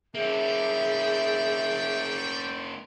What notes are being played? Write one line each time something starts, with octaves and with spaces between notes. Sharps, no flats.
A#3 C#4 G#4 A4 D5 E5 G5